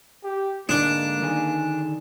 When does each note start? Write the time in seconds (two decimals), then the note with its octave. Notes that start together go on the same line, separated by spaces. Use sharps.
0.24 G4
0.69 G#2 D3 G#3 A#3 D4
1.22 D3 D#3 G#4